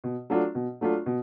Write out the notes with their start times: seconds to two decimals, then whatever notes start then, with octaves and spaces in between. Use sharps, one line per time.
0.04 B2
0.30 F#3 A3 D4 F4
0.55 B2
0.81 F#3 A3 D4 F4
1.06 B2